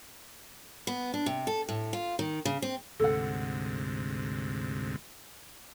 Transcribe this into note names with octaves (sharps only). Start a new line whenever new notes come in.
B3
D4
C3
A4
A2
F4
D#3
C#3
C4
D2 G#2 C3 A4 F#5